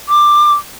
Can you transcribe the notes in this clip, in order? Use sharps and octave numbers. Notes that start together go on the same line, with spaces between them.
D6